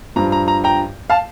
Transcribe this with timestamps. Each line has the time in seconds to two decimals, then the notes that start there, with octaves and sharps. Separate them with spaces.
0.16 G2 F3 A#5
0.32 A#5
0.48 A#5
0.64 G5 A#5
1.10 F5 A5